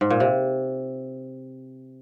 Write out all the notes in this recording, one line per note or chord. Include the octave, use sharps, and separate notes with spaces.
G#2
A#2
C3